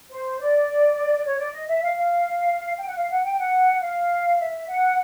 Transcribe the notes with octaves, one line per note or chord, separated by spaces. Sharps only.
C5
D5
C#5
D5
D#5
E5
F5
F5
G5
F#5
F5
F#5
G5
F#5
F5
E5
F#5